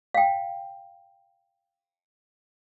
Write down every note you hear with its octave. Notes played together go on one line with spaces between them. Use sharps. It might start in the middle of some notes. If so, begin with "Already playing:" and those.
F5 G5